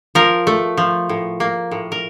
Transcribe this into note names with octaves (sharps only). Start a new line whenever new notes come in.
F3 A#4
A3
F3
A2
A#3
A2
A#4